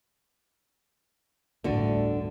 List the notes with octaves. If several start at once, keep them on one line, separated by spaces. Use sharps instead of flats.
G1 D2 A2 D3 D4 F#4